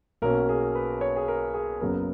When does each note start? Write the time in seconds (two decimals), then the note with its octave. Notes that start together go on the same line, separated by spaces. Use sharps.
0.22 B1 B2 F#3 A#3 C#4 A#4
0.49 G#4
0.75 B4
1.01 C#5
1.16 G#4
1.28 A#4
1.54 G#4
1.81 F#1 F#2 C#3 F#3 B3 A#4